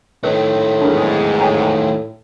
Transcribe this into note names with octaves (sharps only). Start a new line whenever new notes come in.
A2 D#3 A3 A4 B4 D#5
E2 G#2 D4 E4 A#4
A2 G5 G#5 A#5